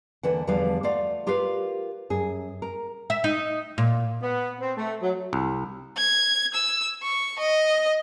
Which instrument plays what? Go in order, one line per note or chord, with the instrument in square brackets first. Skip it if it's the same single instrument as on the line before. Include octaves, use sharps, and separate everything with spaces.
[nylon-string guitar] D#2 D3 E3 F#5
E2 D3 F3 G3 B4 F5
A3 F4 D5 F5 F#5
F4 G4 A#4 B4 F5
F#2 G#4
A#4
[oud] E5
D#4
A#2
[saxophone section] B3
C4
A3
F#3
[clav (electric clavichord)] C2
[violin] G#6
E6
C#6
D#5